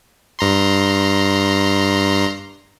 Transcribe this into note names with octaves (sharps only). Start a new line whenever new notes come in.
G2 A#5 C6